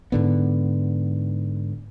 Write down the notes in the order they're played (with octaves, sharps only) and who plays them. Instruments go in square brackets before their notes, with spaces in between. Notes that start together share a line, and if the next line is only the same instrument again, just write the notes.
[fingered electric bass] G#2 D3 B3